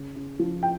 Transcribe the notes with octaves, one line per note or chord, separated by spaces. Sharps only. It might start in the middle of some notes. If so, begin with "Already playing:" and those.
Already playing: C#3
C#3
F3
G5